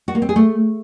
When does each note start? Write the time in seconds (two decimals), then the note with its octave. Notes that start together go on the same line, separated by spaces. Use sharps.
0.08 F#4
0.15 A#3
0.22 C4
0.29 G#4
0.36 A3